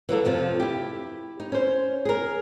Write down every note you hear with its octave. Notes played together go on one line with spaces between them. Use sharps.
E3 F#3 A#3 A4
F2 C3 F3
E4 G4
D#4
C#4 C5
G#4 A#4